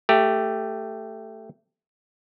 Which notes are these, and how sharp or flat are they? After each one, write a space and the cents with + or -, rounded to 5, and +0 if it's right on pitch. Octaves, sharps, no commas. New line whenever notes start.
A3 +10 G4 +0